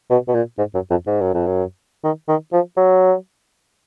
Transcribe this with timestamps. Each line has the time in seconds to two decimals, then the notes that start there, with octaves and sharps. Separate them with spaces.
0.10 B2
0.28 B2
0.35 A#2
0.58 G#2
0.74 F#2
0.91 F2
1.07 G#2
1.21 F#2
1.34 F2
1.47 F#2
2.04 D#3
2.28 D#3
2.53 F3
2.77 F#3